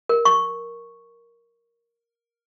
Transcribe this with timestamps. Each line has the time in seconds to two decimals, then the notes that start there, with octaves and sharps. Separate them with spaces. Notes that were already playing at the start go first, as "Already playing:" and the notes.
0.09 A#4
0.25 C#6